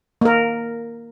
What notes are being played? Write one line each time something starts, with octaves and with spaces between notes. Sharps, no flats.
A#3 A#4